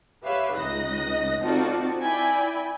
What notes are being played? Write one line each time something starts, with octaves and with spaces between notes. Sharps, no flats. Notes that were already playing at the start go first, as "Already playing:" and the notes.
G4 B4 C#5 E5 F5
C#2 D#4 D#5 F#6 A#6
C4 D#4 F4 F#4 A4 D5
E4 D5 G5 G#5 B5